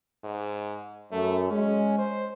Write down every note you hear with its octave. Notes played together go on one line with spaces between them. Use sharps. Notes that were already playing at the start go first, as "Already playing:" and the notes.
G#2
F#2 A3
G#3 C#4
C5